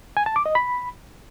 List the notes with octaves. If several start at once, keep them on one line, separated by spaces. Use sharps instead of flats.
G#5
A5
D6
D#5
B5